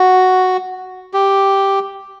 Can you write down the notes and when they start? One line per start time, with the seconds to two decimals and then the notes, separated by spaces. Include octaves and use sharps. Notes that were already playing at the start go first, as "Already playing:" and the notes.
Already playing: F#4
1.14 G4